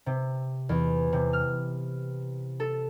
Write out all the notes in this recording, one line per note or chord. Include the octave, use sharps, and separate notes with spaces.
C3
E2
C3
F6
A4